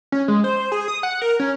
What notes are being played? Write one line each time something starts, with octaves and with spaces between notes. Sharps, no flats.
C#4
G#3
C5
G#4
D#6
F#5
A#4
C#4